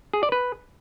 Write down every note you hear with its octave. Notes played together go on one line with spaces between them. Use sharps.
G#4
D5
B4